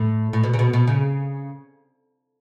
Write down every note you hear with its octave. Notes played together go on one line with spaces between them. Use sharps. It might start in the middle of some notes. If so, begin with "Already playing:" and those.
Already playing: A2
A2
B2
C#3
B2
B2
C#3